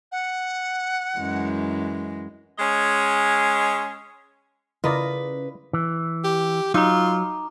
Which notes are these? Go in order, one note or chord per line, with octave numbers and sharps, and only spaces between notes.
F#5
F#2 E3 G#3
G#3 C#4 D#5
C#3 E4 F4 A#4 B4 D5 D#5
E3
G4
F#3 D#4 F4 A#5 D6